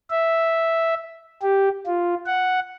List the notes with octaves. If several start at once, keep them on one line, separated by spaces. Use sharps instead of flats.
E5
G4
F4
F#5